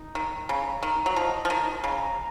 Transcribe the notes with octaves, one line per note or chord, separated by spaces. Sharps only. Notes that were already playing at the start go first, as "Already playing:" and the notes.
Already playing: D#4
D#3 A#5
C#3 A#5
D#3 A#5
F#3
F3 D#5
F3
D#3 A#5
C#3 A#5